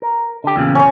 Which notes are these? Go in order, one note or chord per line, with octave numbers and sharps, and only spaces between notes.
A#4
D3 G4
E2 A#2 C#3
C#4 C#5